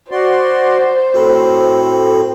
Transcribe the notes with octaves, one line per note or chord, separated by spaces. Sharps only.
F#4 C5 D5 C6
A2 C4 F#4 A4 B5